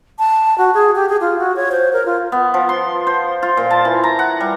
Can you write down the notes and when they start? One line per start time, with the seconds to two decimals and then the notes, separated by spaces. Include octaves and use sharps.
0.19 A5
0.58 F#4
0.74 G#4
0.95 G4
1.09 G#4
1.21 F4
1.39 F#4
1.56 C#5
1.72 C5
1.93 A#4
2.06 F4
2.32 B3
2.54 F3
2.69 C6
3.07 C5
3.42 F4
3.57 A#2
3.70 A5
3.85 E3
4.03 A#5
4.19 F#5
4.40 G3